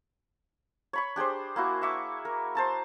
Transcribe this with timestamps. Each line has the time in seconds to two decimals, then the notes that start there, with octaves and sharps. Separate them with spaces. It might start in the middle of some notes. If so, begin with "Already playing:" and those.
0.93 C#5 B5 C#6
1.16 D4 G4 G#4 C5
1.56 A#3 E4 F#4
1.82 E5 C#6 D6
2.25 A#4
2.55 C5 A5 A#5